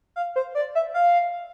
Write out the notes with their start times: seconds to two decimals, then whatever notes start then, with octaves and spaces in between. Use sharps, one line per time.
0.16 F5
0.36 C5
0.55 D5
0.75 E5
0.94 F5